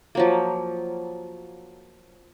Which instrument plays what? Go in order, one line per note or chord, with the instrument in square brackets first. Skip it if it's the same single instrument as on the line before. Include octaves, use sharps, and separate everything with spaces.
[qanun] F3 F#3 A#3